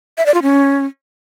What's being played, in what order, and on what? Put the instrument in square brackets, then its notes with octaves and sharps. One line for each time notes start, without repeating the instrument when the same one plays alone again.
[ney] E5
D5
F4
C#4